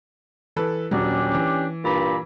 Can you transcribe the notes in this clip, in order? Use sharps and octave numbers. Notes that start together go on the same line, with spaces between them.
E3 A4 B4
D#1 F#3 C#4 D4 G4
E3
G2 A#2 B5